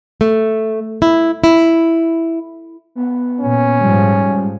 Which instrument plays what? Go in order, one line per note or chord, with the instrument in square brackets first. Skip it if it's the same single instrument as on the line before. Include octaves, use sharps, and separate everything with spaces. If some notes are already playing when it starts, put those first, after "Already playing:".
[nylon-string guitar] A3
E4
E4
[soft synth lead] B3
[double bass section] A#2 [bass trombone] C#4
[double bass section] G#2 F3 [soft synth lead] G3